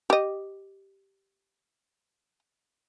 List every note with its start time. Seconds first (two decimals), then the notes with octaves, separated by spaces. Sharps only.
0.10 G4 D#5